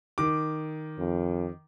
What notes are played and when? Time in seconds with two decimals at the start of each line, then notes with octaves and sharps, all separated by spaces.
0.18 D#3 D6
0.99 F2